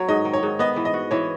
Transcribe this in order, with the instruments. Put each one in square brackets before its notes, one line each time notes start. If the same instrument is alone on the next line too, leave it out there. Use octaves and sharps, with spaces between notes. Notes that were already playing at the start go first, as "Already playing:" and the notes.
Already playing: [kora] F#3 [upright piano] C#5
[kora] G#2 [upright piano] D#5
[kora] D#3
[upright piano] C#5
[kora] G#2
[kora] B3 [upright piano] D#5
[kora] E3
[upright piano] D#5
[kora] F#4
[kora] E3 [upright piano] C#5